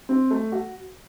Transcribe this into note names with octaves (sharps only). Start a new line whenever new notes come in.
C4
A3
F#4